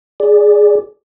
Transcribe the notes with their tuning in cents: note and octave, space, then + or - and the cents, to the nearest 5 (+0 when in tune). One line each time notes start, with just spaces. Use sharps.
G#4 +0 D5 -5